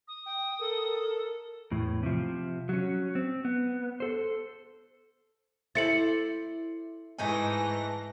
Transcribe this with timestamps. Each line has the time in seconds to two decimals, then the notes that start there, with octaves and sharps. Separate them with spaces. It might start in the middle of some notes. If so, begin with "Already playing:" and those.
0.08 D#6
0.26 G5
0.60 A4 A#4
1.71 E2 A2
2.03 C3 F3
2.69 F#3 C#4
3.15 C4
3.45 B3
4.00 A4 C5
5.75 E4 A4 C5 D5 A6 C#7 F#7
7.19 G#2 E3 A3 D#4 G#5 A#6